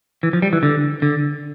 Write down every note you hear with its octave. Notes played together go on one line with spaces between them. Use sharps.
E3
F3
G3
E3
D3
D3